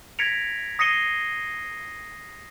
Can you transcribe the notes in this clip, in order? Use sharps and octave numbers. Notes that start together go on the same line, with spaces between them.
G#6 A#6 B6 C#7 D7 F7
D#6 A#6 C7 C#7 D#7 G7